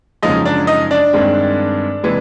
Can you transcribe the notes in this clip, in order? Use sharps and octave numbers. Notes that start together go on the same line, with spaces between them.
F#2 C#3 F3 G#3 D#4 D#5
D4 D5
D#4 D#5
D4 D5
G2 D#3 G#3 C4
C3 E3 G#3